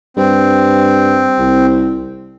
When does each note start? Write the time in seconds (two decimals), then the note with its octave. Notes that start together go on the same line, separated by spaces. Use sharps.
0.17 G2 C4
1.39 C2